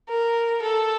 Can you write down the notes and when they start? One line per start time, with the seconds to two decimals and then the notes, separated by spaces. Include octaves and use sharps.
0.09 A#4
0.62 A4